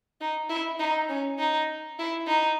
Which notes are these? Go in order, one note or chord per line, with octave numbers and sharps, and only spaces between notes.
D#4
E4
D#4
C#4
D#4
E4
D#4